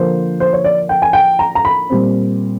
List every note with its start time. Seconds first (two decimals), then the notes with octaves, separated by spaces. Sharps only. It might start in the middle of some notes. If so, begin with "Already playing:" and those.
Already playing: D3 F3 A#3 C5
0.40 C5
0.53 C#5
0.64 D5
0.89 G5
1.02 G#5
1.13 G5
1.39 A#5
1.55 A#5
1.65 B5
1.90 A#2 G3 C4